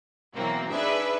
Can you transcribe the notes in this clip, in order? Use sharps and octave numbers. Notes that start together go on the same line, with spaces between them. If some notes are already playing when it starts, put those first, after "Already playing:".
B2 E3 F#3 A#3 C4
D4 D#4 G#4 B4 E5